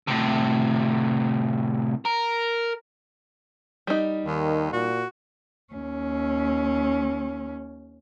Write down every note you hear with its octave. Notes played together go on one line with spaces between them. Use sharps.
A2 C3
A#4
G3 D#4
D#2 D#3
A#2 F#4
D#2 C#4